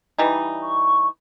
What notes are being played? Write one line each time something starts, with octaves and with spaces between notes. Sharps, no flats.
E3 G3 D#4
C#6